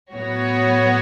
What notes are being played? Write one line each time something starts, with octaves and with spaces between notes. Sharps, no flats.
A2 F#3 B3 F#4 C#5